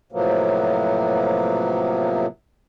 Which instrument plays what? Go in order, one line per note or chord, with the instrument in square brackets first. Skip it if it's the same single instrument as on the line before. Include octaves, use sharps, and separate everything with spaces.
[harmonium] A2 C3 F3 F#3 A#3 B3